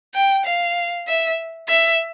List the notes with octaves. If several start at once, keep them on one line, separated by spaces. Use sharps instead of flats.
G5
F5
E5
E5